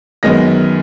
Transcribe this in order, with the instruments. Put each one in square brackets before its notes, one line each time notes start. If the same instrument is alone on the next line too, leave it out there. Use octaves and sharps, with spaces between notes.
[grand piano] F#2 D#3 G#3 B3 A#6